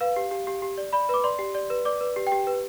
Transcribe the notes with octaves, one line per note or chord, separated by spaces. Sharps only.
B4 F5
G4
G4
G4
G4
D5
D5 B5
B4 D6
D5 C6
G4
D5
B4
D5 D6
B4
G4
G5
G4
B4